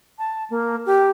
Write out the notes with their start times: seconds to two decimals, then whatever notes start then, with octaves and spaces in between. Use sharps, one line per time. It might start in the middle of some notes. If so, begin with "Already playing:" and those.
0.19 A5
0.50 A#3
0.86 G4